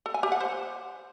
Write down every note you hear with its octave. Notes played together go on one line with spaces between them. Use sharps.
A4
G#5
G4
F#5
C5